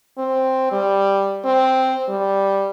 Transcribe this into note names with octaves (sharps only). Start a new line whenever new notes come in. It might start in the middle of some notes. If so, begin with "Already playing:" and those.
C4
G3
C4
G3